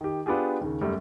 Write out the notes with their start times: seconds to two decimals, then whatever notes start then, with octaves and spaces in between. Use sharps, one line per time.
0.01 D#3 G4
0.26 B3 D4 F4 G4 G#4
0.61 D#2 C#3
0.81 F#2 G3 A3